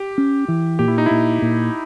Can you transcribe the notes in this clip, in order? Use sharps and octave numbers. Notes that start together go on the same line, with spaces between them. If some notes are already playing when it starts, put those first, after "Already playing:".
Already playing: G4
C#4
E3
A#2 G4
E4
D#4
A#2 E4
A#2